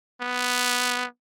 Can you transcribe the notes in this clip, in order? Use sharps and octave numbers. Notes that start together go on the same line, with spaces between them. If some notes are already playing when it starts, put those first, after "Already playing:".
B3